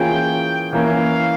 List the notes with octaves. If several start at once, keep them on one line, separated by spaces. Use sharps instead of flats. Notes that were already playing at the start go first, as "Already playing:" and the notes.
Already playing: E3 A#3 C#4 F4 G#4 G5
E3 A#3 C#4 F5